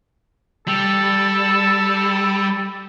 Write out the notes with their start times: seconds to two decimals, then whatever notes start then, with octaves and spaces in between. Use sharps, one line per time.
0.68 G3 A4